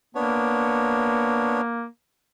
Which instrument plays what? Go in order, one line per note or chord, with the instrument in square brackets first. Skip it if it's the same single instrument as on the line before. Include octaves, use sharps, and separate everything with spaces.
[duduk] A#3 [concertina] B3 D4 C#5